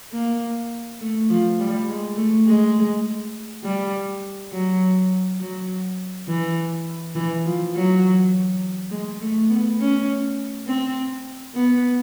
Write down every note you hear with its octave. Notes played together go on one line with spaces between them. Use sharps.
A#3
A3
F3
G3
G#3
A3
G#3
G3
F#3
F#3
E3
E3
F3
F#3
G#3
A3
B3
C#4
C4
B3